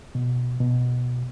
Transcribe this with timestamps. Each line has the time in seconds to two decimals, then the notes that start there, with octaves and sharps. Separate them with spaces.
0.15 B2
0.60 B2